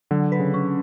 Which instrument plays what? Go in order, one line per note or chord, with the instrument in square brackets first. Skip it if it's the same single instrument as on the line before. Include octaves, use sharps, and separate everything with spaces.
[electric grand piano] D3 [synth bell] F#3
[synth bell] B4
[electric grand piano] C#3
[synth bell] C#4